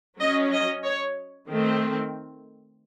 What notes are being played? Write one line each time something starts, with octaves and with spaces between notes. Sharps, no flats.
F#3 C#4 D#5
D#5
C#5
D#3 A3 C4